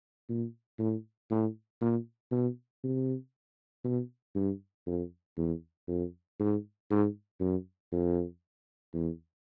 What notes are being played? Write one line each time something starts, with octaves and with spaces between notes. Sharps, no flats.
A#2
A2
A2
A#2
B2
C3
B2
G2
F2
E2
F2
G#2
G#2
F#2
F2
E2